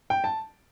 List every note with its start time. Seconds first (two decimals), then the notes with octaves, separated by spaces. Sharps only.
0.10 G5
0.24 A5